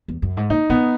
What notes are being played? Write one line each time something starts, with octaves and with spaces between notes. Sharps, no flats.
E2
F#2
G#2
A#2 D#4
B2 B3